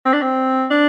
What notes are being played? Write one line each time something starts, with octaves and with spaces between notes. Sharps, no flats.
C4
D4
C4
D4